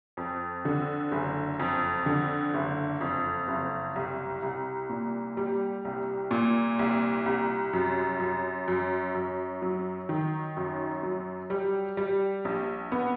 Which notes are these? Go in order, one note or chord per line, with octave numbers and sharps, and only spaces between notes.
F2
D3
F#1
F2
D3
F#1
F2
F#1
C2
C2
A#2
G3
C2
A#2
C2
C2
F#2
F#2
F#2
F#2
F#3
D#3
F#2
F#3
G3
G3
A#1
B3